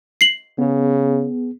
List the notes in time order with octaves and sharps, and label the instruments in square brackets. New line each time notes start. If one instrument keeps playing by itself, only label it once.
[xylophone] C7 F#7
[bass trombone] C#3 [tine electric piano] B3 G#4